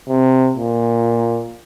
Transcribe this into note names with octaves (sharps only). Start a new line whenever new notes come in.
C3
A#2